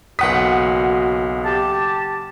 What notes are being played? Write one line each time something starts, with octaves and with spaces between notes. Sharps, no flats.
F#1 B1 F#4 F#5 D#6 B6
G4 A5